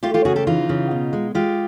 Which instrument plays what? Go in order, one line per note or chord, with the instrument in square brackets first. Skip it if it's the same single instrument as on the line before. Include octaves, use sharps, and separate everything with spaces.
[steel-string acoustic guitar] A3 F4 G4
F4 G4
C#3 F#4 G#4
G4 A4
E3 D#4 F4
C#3
B2
G#3
G#3 F4 G4